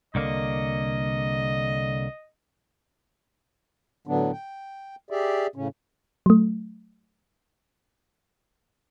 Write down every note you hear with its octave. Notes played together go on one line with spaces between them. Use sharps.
C2 D3 A#3 D#5
A2 D3 F#3 B3 D4
G5
G4 G#4 D5 E5
A2 C#3 C#4
F#3 A3